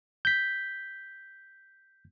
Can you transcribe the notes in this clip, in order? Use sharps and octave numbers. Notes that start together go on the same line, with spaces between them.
G6 B6